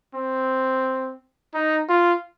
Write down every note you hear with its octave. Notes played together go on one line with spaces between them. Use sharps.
C4
D#4
F4